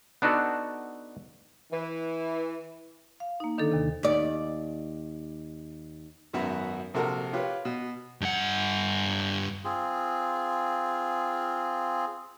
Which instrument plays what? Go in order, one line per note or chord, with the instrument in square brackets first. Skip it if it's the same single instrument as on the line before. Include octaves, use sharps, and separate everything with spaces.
[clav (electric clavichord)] B3 D4 D#4 F#4 A4
[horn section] E3
[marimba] F5
A#3 D#4
D3 D#3 D4 D#4 A4
D#2 C3
[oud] D#2 D5
[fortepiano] G#1 F#2 B3 F#4 E5 F#5
A#1 C3 F#4 A4 A#4
F4 G4 B4 C#5
B2
[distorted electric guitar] G2 F#5
[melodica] C4 F4 G#4